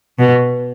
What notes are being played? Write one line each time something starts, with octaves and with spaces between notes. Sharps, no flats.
B2